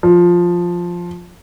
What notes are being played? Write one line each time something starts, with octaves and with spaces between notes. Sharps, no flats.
F3